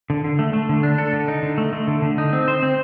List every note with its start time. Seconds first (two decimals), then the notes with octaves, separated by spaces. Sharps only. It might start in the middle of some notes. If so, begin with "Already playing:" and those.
0.10 D3
0.24 D3
0.39 A3
0.53 A3
0.69 D3
0.83 D4
0.98 A4
1.13 D3
1.28 D#4
1.43 D3
1.58 A3
1.73 A3
1.87 D3
2.02 D3
2.18 D#4
2.33 C4
2.48 C5
2.63 C4